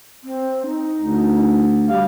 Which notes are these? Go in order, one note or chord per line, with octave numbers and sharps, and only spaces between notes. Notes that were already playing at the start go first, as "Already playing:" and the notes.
C4
D#4
D2
G3 G4 F5